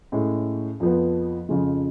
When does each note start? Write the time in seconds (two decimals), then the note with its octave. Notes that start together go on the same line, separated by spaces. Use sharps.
0.12 A2 G#3 C#4
0.80 F2 F3 B3
1.49 F2 C#3 F3 G#3